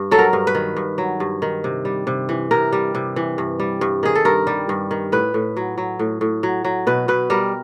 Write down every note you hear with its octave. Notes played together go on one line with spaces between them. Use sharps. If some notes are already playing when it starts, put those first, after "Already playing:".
Already playing: G2
F#3 A4
A#4
G2
B4
D#3
G2
F#3
G2
D#3
C3
G3
C3
E3
C3 A#4
G3
C3
E3
G2
G3
G2
D#3 G#4
A4
G2 A#4
G3
G2
D#3
A2 B4
A2
F#3
F#3
A2
A2
F#3
F#3
B2 B4
B2 B4
G3 A#4